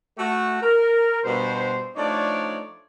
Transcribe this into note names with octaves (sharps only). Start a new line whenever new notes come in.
A3 F#4
A#4
G2 B2 C5
F3 A3 D4 D#4 C#5 D5